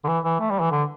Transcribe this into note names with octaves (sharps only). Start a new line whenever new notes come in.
D3
E3
E3
A3
G3
E3
D3